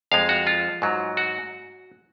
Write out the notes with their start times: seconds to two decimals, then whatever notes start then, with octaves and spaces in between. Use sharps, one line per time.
0.12 F2 F3 G#3 F5
0.29 F#4
0.47 F4
0.82 G#2 F#3
1.17 F#4